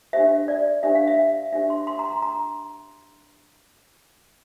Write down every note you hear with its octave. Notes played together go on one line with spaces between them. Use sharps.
D4 G4 C5 E5
D5
D4 G4 C5 E5
F5
E5
D4 G4 C5 E5
C6
C6
A#5
C6
A#5